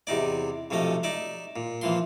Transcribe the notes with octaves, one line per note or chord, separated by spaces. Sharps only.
E2 C3 D#4 D5
B1 C3 F3 A3 D#5
D#4 D5 E5
A#2
A#2 E3 F3 C6